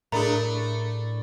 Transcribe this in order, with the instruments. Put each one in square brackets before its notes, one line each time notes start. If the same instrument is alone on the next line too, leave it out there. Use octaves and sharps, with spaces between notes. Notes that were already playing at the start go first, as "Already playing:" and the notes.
[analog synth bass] A2 [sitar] A3 D4 [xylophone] G#4 A#5 [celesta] A#4 B5